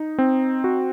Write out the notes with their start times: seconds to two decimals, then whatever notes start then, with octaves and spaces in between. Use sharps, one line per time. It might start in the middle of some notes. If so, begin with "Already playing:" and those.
Already playing: D#4
0.18 C4
0.64 F#4